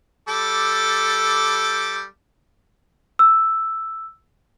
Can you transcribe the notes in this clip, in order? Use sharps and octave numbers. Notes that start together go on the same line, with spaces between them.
G3 A4 D6
E6